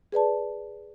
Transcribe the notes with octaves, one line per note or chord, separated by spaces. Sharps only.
G#4 B4 D5 A5